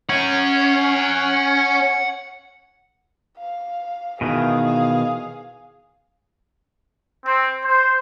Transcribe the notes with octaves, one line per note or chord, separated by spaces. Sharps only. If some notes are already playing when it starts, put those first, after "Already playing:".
C#4 F#5 G#5
F5
B2 D#3 E3 G#4 F5
C4
C5